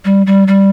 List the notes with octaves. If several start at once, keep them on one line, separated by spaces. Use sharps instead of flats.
G3
G3
G3